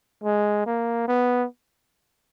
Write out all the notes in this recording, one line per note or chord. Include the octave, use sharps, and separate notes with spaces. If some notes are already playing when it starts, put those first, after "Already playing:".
G#3
A#3
B3